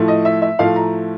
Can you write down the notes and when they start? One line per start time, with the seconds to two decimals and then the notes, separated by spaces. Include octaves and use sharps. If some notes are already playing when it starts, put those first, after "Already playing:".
Already playing: A2 F3 A3
0.08 D#5
0.25 E5
0.42 E5
0.59 A2 F3 A3 F5
0.76 A#5